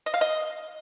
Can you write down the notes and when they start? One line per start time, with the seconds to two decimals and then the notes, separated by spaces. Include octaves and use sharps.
0.06 D#5
0.14 F5
0.21 D#5